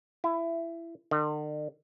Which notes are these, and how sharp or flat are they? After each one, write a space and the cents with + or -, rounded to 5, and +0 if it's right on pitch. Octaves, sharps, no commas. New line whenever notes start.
E4 +20
D3 +45